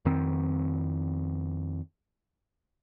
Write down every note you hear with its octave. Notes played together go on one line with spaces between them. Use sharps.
F2 D#3 C4